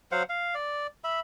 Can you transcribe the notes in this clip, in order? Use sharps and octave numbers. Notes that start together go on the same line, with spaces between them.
F#3 C5 F5 F#5
F5
D5
E5 B5